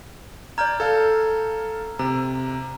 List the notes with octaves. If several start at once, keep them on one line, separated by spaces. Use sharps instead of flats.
D5 A#5 F6 G6 G#6
A4 F5
C3 A#5